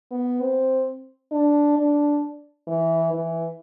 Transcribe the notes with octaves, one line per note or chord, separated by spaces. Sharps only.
B3
C4
D4
D4
E3
E3